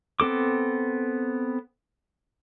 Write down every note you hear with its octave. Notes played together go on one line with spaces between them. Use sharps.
B3 C4 A4 D6